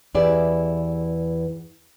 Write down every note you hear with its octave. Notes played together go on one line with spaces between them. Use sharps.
E2 E4 G4 G#4 D5